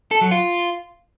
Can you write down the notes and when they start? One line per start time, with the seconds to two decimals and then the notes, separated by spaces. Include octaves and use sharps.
0.11 A4
0.21 F#3
0.31 F4